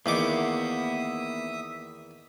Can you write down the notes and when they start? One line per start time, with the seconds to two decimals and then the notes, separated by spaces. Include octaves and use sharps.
0.06 E2 D#3 A#3 B3 E5 D6 D#6